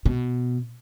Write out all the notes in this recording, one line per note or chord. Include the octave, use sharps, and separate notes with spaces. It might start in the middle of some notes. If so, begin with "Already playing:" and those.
B2